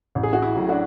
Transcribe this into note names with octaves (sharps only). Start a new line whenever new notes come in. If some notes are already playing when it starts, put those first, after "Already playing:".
A1
G#4
F#4
E4
A2 F#3
D4 F#4